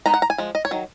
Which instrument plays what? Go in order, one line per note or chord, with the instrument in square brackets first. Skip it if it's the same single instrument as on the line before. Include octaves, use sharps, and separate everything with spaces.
[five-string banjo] G#3 B3 D#4 A#5
F#5
A#5
G#5
F3 G#3
D#5
C#5
D#3 F#3